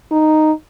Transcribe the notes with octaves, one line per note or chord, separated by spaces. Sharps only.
D#4